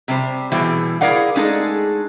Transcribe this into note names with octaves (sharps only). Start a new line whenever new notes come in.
C3 G3 C5
B2 E3 G3 E4 G#4
E4 G#4 A#4 D5 F5 F#5
G#3 A3 D4 D#4 G#4 A4